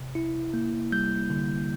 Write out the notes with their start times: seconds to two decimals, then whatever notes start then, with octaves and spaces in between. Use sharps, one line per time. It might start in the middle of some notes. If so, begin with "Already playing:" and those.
Already playing: C3
0.15 E4
0.54 A#3
0.92 G3 G6
1.30 D3